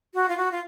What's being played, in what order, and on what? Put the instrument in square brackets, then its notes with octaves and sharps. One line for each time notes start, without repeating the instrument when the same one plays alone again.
[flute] F#4
F4
F#4
F4